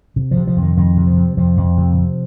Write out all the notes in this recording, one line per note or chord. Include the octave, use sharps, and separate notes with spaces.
C3
F3
C3
F3
F2
D#3
F2 D#3
C3
F3
C3
F2 F3
F2
C3
C3